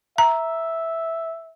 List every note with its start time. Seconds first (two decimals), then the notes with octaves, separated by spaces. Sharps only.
0.18 E5 A#5